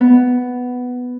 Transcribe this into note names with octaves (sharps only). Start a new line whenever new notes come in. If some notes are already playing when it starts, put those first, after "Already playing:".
B3